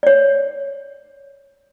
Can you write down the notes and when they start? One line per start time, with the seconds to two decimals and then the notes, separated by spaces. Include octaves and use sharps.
0.03 C#5 D5